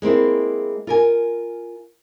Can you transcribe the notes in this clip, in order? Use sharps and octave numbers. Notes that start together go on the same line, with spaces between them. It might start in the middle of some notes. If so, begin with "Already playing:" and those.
G#3 A#3 C4 E4
F4 A#4 G#5